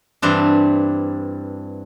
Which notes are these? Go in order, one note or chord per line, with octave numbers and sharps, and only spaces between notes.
G2 E3 C4 D4